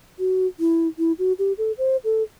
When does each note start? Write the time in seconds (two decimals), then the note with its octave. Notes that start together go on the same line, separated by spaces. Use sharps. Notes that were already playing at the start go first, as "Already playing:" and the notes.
0.19 F#4
0.60 E4
0.98 E4
1.19 F#4
1.39 G4
1.58 A4
1.78 C5
2.04 A4